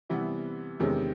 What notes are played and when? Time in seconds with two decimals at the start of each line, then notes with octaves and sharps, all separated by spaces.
0.10 C3 E3 G3 B3
0.80 E2 C3 D#3 G#3 C#4